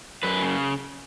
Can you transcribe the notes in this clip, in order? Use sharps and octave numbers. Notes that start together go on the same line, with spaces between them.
F#2 B4
C#3